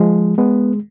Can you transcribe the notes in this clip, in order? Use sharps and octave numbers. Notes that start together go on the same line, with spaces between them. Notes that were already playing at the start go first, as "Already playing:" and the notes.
Already playing: F3 G#3
G#3 B3